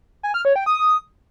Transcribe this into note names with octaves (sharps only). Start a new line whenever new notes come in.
G#5
F6
C#5
G5
D#6